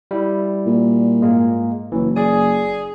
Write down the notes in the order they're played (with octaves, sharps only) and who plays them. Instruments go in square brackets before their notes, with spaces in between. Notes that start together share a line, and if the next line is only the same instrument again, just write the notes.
[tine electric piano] G3 E4
[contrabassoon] A#2
[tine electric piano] G#2 G#3 A#3
[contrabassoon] F#1 [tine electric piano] E3 F#3
[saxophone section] G#4 [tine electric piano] D5